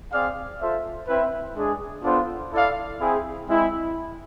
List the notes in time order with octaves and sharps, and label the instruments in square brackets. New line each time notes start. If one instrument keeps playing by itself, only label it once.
[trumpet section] C4 G#4 D5 F5
F4 A4 C5 E5
C4 E4 B4 E5
G#3 D4 G#4
B3 D4 F4 A4 C5
E4 A4 D5 F5
C4 E4 G#4
G#3 C4 E4